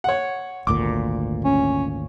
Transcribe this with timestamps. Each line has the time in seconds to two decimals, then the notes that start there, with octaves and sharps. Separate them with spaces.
0.04 C#5 F#5
0.67 G#1 D2 A#2 D6
1.44 C#4